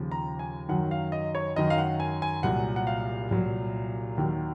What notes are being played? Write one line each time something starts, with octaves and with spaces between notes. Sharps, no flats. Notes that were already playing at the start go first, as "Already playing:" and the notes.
Already playing: D#2 C#3 F3
A#5
G#5
F#2 D#3 F#3 F#5
F5
D#5
C#5
F#2 D#3 F#3 D#5
F5
F#5
G#5
G#5
C2 A#2 F#3 F#5
F#5
F5
C2 A#2 F#3
D#2 D#3 F#3